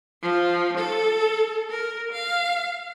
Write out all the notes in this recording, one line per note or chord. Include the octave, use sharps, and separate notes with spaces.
F3
A4
A#4
F5